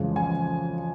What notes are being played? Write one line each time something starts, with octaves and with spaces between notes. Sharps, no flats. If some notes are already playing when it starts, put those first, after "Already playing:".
Already playing: F2 C#3 E3 G#3 C#4
G#5